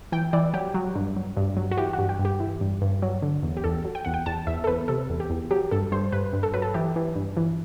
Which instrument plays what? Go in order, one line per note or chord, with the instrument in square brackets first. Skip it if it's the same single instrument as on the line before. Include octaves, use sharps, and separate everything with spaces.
[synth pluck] E3 G5
E3 D5
F#3 G4
F#3
G2
F#3
G2
F#3
F#4
E3 G4
F#4
G2
G4
G2
G4
E3
G2
G2
F#3
D3
E2
G4
E2 A4
F#3
G5
E2 F#5
G5
E2 A5
E2 E5
A4
E2 B4
C3 A4
E2
G4
E2
F#3 G4
G2 A4
G2 C5
G2 B4
G2
A4
F#3 B4
A4
E3 G4
E3
G2
E3